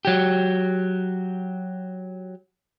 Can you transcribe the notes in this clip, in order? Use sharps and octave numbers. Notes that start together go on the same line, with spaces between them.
F#3 G4